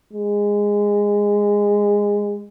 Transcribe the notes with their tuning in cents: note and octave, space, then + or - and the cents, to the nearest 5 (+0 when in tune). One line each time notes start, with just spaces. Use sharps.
G#3 -15